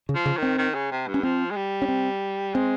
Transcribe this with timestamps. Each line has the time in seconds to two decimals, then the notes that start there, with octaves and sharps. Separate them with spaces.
0.09 C#3
0.15 F3
0.26 C#3
0.37 D#3
0.43 C4
0.58 D#3
0.74 C#3
0.91 C3
1.07 G2
1.14 C#4
1.23 F3 C4
1.51 G#3
1.56 G3
1.82 C#4
1.88 C4
2.54 G#3 C4